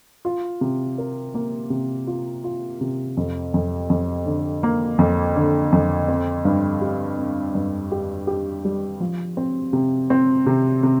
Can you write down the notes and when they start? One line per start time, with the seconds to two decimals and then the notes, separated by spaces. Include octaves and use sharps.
0.25 F4
0.61 C3
0.98 A#4
1.34 A#3
1.70 C3
2.07 F4
2.44 F4
2.81 C3
3.17 F2
3.54 F2
3.90 F2
4.26 D3
4.63 A#3
4.99 F2
5.36 D3
5.72 F2
6.08 C4
6.45 G2
6.81 G4
7.18 C4
7.55 G2
7.92 G4
8.27 G4
8.65 G3
9.00 F3
9.37 C4
9.73 C3
10.10 C4
10.46 C3
10.83 C3